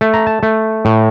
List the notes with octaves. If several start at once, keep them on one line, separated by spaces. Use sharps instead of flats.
A3 A5
A#5
A5
A3
A2